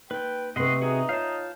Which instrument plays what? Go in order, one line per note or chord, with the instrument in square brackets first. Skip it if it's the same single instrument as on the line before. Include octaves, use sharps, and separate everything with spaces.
[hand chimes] A#3 D#4 [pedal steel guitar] B4 [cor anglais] G5
[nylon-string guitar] C3 C4 B4 [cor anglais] A3 [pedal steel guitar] D#5 F#5 C6
[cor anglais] D#4 [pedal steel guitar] F#4 G#4 [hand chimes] E5
[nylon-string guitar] F4 [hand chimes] C#5 G6 [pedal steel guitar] F5 A5